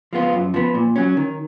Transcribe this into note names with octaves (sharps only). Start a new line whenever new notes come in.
F3 G#3 B3 F4
F#2
F3 B3
A#2
F#3 C#4
D#3